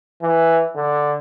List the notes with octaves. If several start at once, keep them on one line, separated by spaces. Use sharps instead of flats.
E3
D3